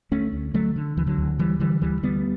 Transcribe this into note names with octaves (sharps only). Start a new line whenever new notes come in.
D2 A3 C#4
D2
D3 F#3 A3
D3
D2 E3
D3 F#3
D2
D3 E3 G3
D3 E3 G3
D2 E3 G3
D2 G3 B3